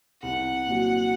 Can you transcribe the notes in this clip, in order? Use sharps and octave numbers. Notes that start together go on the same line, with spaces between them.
C2 F#5
A#2 F#3